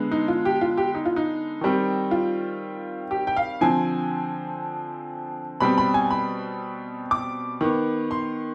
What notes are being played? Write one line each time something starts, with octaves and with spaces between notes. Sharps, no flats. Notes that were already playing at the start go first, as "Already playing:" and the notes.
Already playing: D3 G#3 B3
D#4
F4
G4
F4
G4
D#4
F4
D#4
D#3 G3 C4
F4
G4
G5
F5
D3 F3 C4 G#5
B2 G3 C4 B5
B5
G#5
B5
D6
D#3 B3
C6